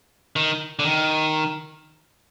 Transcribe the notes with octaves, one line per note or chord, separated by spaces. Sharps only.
D#3
D3
D#3